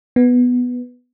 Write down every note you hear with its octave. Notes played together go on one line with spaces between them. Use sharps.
B3